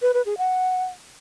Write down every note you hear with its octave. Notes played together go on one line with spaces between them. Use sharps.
B4
B4
G#4
F#5